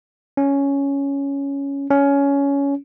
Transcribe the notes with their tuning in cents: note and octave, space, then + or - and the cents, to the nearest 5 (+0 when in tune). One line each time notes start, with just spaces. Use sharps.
C#4 +5
C#4 +15